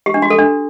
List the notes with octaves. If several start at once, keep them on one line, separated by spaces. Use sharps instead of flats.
G4
D4
F#4
A4
D4